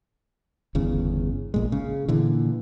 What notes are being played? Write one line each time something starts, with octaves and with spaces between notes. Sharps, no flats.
G1 E2 C#3
A#1 A#2 G#3
C#3
A#2 D3 E3